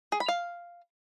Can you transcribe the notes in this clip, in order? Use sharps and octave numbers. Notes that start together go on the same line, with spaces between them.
G#4
B5
F5